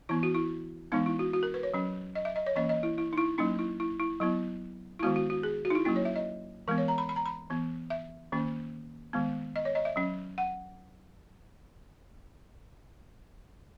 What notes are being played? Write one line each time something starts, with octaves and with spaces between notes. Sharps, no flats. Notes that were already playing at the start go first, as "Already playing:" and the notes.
E3 B3 E4
F#4
E4
E3 G#3 B3 D#4
E4
F#4
F#4
A#4
B4
C#5
F#3 C#4
D#5
E5
D#5
C#5
E3 A#3 C#4 D#5
D#5
E4
E4
D#4
E4
F#3 A#3 C#4 D#4
E4
E4
E4
F#3 B3 E4
E4
D#3 G#3 B3 F#4
F#4
F#4
G#4
F#4
D#4
E4
F#3 A#3 C#4 E4
C#5
E5
D#5
E3 G#3 B3 A#4
C#5
A#5
B5
B5
A#5
B5
E3 B3
E5
D#3 A#3 C#4
D#3 G#3 B3
D#5
C#5
D#5
E5
F#3 C#4
F#5